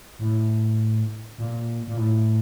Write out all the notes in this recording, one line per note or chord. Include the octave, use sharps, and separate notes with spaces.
A2
A#2
A#2
A2